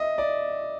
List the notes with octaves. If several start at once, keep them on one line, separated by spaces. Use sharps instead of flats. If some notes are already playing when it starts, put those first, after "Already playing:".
Already playing: D#5 E5
D5